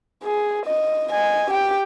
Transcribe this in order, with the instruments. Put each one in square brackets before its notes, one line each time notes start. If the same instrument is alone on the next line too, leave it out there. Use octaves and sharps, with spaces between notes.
[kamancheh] G#4
D#5
D#5 G#5
G4 G5